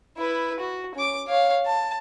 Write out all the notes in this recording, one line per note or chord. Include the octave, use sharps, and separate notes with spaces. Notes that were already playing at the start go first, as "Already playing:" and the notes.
E4 B4
F#4
C#4 D6
C#5 F5
A5